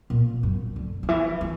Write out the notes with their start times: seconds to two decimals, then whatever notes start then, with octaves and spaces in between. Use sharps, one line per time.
0.10 A#2
0.43 F#2
0.76 D3
1.03 D3
1.09 E3
1.41 E3